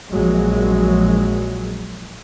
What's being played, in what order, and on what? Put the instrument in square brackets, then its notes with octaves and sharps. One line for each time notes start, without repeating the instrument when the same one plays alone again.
[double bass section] A#1 F#3 G#3